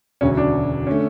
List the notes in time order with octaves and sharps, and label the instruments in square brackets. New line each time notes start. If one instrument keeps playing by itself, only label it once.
[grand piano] E1 D2 C#3 F#3 [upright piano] C#4
[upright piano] D4
[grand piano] D3 A3 [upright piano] C#4